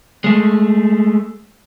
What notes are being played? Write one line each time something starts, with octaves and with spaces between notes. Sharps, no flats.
G#3 A3